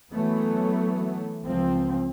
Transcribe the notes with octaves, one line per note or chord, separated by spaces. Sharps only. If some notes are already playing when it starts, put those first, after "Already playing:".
E3 F#3 A3 B3
C#2 F3 C4